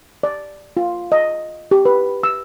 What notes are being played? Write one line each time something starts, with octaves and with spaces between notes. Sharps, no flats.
D5
F4
D#5
G4
B4
E6